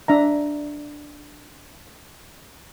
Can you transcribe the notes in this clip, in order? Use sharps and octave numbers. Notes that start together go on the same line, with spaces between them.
D4 E5 A#5